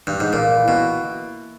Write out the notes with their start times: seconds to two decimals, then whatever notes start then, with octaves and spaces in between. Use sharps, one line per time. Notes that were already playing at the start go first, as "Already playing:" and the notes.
0.07 G2
0.20 G#2
0.33 A#2 A#3
0.56 E3
0.68 B2